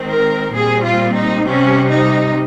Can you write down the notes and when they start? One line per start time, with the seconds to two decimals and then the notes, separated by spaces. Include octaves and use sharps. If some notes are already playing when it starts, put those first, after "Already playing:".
Already playing: D#3 G#3 C4
0.09 A#4
0.54 A#2 G3 C4 G#4
0.84 F4
1.14 D#4
1.45 C3 G3 C4 C#4
1.90 D#4